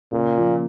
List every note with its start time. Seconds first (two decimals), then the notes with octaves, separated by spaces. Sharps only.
0.13 A#2 C#3
0.37 F3 A#3